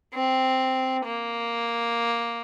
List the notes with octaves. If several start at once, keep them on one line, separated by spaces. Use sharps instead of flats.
C4
A#3